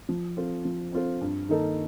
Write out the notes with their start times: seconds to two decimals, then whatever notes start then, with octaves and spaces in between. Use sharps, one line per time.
0.09 F3
0.37 C4 F4 A4 C5
0.65 F3
0.93 C4 F4 A4 C5
1.21 G2
1.49 D#3 A#3 D#4 A4